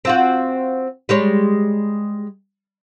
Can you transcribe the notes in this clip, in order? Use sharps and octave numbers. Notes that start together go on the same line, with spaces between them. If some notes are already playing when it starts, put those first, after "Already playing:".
C4 F4 F#4
G3 G#3 C#5